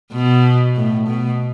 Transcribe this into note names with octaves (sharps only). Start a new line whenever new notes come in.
B2
A2
B2